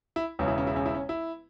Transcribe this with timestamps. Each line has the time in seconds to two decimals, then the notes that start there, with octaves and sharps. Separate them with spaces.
0.16 E4
0.39 E1 E2 C#3 C#4
0.48 E4
0.58 C#4
0.67 E4
0.76 C#4
0.86 E4
0.94 C#4
1.09 E4